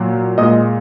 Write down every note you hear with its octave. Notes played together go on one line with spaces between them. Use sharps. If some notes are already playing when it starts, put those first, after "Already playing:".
Already playing: A#2 F#3
A#2 G#3 D#5 D#6